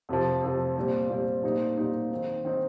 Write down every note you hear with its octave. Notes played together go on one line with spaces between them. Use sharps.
F2 C3 F3
F2 C3 F3
A#2 G3 C4
A#2 G3 C4
A#2 G3 C4 D#4
A#2 G3 C4 D#4
D#3 C4 D#4
D#3 C4 D#4